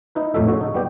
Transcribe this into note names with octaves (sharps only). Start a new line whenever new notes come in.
D#4 E4 B4
F2 A2 A3 D#4 A4 E5
C#3 F#4 C#5
D#4
G3 B3 G4